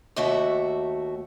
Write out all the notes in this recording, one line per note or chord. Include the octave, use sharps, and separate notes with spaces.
D#2 A3 F#4 E5